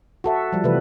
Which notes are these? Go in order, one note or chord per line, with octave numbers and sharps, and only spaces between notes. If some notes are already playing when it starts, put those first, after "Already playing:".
F#4 A4 E5
F3 G3
C3 E3 A3 B4